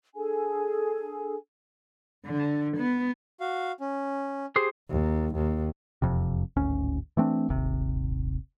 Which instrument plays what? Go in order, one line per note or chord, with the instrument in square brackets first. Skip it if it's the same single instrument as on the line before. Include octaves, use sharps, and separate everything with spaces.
[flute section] D4 G#4 A4 G#5
[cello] D3
B3
[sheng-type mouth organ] F#4 F5
C#4
[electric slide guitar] G4 G#4 C5
[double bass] D#2
D#2
[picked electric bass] E1 F2 C3
D1 G#1 D2 C#4
E3 A3 C4 D4
D#1 G#1 C3